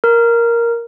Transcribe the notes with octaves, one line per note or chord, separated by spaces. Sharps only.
A#4